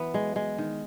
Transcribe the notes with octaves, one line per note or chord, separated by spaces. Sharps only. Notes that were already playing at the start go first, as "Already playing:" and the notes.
Already playing: E3 B3
G#3
G#3
D#3